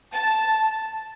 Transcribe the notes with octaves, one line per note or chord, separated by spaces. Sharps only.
A5